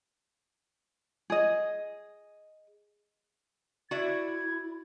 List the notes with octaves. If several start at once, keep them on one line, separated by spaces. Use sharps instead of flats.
G#4 D#5
E4 F#4 D5 E5 G#6